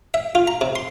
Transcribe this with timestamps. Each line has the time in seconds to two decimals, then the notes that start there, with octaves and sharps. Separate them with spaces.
0.14 E5
0.35 F4
0.48 A#5
0.61 C3
0.76 C6